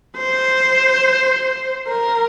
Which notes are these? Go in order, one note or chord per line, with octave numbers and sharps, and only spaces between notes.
C5
A#4